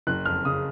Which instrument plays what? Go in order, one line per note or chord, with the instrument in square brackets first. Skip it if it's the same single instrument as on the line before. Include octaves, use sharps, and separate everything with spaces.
[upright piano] F#1 [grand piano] F#6
[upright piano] F2 [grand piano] F6
[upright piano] C#3 [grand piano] D#6